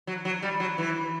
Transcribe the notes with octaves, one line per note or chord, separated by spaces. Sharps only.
F#3
F#3
G3
F#3
E3